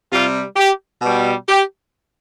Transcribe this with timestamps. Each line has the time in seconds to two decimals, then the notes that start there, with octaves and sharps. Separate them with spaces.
0.11 C3 G3 F4
0.56 G4
1.02 B2 G3
1.48 G4